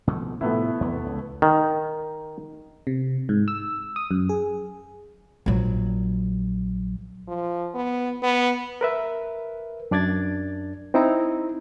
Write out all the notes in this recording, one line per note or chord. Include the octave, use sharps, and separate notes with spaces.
B2 F3 A3
A2 C3 F3 A3 B3 E4
E2 C3
C#2
D#3
C3
G#2
E6
D#6
F#2
G#4
A#1 F#3
F3
B3
B3
A#4 B4 E5
F#2 D4 D5 G#6 A6
C4 D#4 E4 A#5